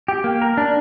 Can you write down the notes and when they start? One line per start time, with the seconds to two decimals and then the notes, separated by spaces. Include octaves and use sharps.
0.08 G4
0.24 A#3
0.42 A#4
0.57 D4